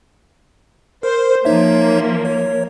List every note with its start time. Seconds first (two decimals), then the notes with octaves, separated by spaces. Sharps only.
1.03 A#4 C5
1.45 F3 A#3 D#4 C#5 E5
2.25 C#5